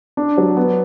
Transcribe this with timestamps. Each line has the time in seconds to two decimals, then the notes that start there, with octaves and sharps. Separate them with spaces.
0.17 D4
0.38 F#3
0.57 B3